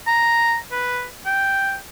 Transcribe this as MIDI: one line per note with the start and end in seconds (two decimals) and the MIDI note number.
0.07 0.56 82
0.71 1.05 71
1.26 1.76 79